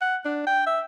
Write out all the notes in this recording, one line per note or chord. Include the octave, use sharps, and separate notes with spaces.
F#5
D4
G5
E5